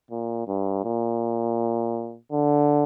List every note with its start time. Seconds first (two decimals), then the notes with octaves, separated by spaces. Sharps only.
0.11 A#2
0.48 G2
0.85 A#2
2.32 D3